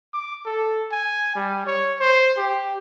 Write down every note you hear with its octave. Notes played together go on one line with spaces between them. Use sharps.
D6
A4
G#5
G3
C#5
C5
G4